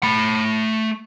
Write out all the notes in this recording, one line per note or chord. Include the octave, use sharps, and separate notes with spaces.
A3 B5